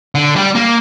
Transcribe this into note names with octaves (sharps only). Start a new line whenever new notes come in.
D3
G3 G4
A#3